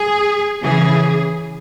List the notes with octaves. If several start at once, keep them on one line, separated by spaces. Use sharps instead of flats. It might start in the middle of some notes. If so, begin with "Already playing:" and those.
Already playing: G#4
C#3 E3 G#4